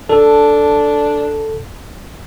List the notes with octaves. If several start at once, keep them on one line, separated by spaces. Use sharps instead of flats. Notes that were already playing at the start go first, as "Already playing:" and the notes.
D4 A4